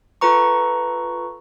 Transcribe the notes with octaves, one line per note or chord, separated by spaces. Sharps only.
F4 A4 B4 A#5 C#6